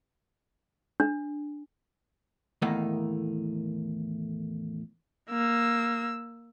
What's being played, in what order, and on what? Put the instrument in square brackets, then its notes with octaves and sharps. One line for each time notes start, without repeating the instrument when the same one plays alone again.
[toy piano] D4
[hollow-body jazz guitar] E2 A2 D#3 A3 A#3 D#4
[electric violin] A#3 E6